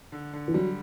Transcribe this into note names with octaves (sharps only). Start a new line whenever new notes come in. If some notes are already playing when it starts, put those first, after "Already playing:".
D3
D3
E3
F#3 G3